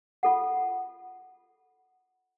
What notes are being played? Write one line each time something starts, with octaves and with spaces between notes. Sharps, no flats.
F4 A4 F#5